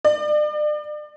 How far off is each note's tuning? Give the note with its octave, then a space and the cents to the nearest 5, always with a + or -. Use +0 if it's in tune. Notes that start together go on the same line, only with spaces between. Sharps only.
D5 +35